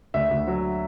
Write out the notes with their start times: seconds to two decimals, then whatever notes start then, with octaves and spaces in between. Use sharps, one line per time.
0.14 D2 E5
0.31 D2
0.47 F#3